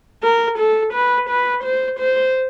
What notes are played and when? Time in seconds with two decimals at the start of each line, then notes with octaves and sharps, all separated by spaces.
0.23 A#4
0.58 A4
0.93 B4
1.29 B4
1.64 C5
1.99 C5